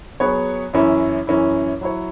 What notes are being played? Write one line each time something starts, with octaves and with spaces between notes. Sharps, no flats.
F#3 B3 G#4 C#5
F#2 E3 C#4 E4
F#2 E3 C#4 E4
F#3 E4 C#5